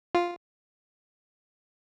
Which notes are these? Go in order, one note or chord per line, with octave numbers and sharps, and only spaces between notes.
F4